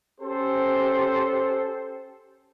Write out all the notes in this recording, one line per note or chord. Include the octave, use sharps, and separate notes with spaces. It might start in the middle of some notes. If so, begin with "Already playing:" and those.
C#4 G4 A4 C5